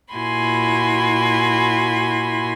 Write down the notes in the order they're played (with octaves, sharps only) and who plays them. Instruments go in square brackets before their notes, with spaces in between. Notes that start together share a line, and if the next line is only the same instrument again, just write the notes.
[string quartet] A#2 E4 F#4 G#5 B5 C6